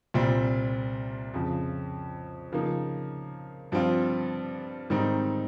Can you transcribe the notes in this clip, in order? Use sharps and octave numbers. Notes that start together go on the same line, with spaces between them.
C2 A#2 G3 C4
F2 C#3 F3
C#3 F3 A#3 D#4
G2 F3 C4 F4
G#2 D#3 G3 C4 D#4